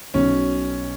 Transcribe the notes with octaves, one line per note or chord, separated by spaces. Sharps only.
B1 B2 F#3 C#4